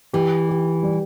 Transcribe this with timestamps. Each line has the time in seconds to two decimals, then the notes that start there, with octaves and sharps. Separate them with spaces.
0.13 E3 G4
0.49 G4
0.83 G3